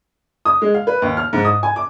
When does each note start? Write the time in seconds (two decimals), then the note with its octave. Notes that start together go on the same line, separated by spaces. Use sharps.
0.45 D#6
0.62 G#3
0.74 F5
0.87 B4
1.02 D#2
1.17 F6
1.33 G#2
1.45 D#6
1.63 G#5
1.76 D6